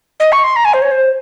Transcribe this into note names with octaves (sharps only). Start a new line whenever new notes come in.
D#5
C#6
C6
A#5
G#5
C5
C#5
C5